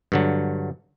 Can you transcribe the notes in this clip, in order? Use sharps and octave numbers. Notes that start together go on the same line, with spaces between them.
G2 D3 F#3